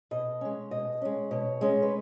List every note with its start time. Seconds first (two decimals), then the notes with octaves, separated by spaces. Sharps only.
0.11 B2 D#5
0.41 G#3 C#4
0.71 B2 D#5
1.02 G#3 C#4
1.31 B2 C#5
1.61 G#3 C#4
1.82 B4